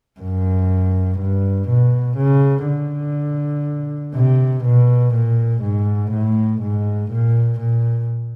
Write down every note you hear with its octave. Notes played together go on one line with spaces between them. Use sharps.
F#2
G2
B2
C#3
D3
C3
B2
A#2
G#2
A2
G#2
A#2
A#2